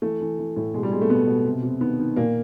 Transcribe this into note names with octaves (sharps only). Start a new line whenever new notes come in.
E3 A3
E3
E3
A2
B2 G#3
G3
B2 G#3
A3
B2 B3
B2
C3
C3
D#3 B3
D#3
A#2 A#3